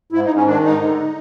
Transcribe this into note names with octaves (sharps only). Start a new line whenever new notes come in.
G#2 E4
D#4
G#2
C#4
D#3 D4
G#2 D#4
D3